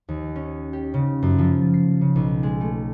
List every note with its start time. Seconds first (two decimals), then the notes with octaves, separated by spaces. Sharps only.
0.09 D#2
0.36 C#4
0.73 G4
0.94 C#3
1.22 F#2
1.38 F3
1.51 F4
1.74 C7
2.01 C#3
2.16 B1
2.43 G#3
2.61 A3